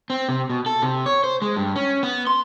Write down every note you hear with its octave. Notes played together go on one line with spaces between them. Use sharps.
C4
C3
B2
A4
C3
C#5
C5
G#3
G2
C#4
B3
C6